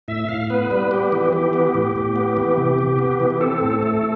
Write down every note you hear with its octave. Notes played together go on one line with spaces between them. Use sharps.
A2 E5
A2 F5
B3 B4
G3 B4
B3 G4
E3 G4
E3 G4
B3 G4
A2 G4
A2
B3
E3
C3
C3
B3
E3
G4
C4 A4
A2
A3